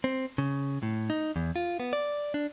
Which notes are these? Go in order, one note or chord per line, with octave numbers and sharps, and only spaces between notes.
C4
C#3
A2
D#4
E2
F4
B3
D5
D4